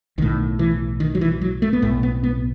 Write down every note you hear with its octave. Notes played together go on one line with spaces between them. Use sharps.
B1 A2 D#3
E3
D#3
F#3
E3
F#3
A3
B3
B1 A2 A3
B3
B3